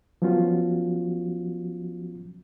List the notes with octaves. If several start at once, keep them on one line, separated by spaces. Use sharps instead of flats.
F3 F#3 B3 C#4 F4 F#4